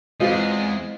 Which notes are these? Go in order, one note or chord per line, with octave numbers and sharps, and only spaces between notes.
E2 E3 G#3 C4 F4 D#5